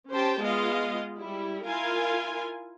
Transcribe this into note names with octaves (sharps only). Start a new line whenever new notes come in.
C#4 G4 C5 G5 A5
G#3 B3 F4 D#5 F5
G3 E4
E4 F4 A#4 F5 G#5